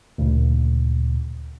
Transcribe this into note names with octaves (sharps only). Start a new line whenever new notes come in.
D2 A#2 C#3